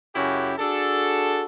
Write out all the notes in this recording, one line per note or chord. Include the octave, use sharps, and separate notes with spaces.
F#2 C#3 C#4 E4 F#4 G4
D4 F#4 G#4 A4